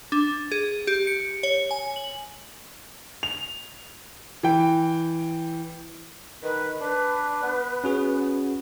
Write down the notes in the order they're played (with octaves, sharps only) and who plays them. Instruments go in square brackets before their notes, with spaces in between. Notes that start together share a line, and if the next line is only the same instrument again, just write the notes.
[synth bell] D4
G#4
G4
C#7
C#5
G#5
F#7
[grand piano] F7
E3 G5
[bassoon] D#3 [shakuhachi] B4
[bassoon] D4 [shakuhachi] B4
[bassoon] B3
[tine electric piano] C#4 F#4 G#4